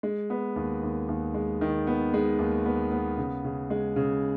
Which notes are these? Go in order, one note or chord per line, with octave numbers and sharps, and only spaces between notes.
G#3
B3
D#2
D#2
D#2
G#3
D#3
B3
G#3
D#2
B3
B3
C#3
C#3
G#3
C#3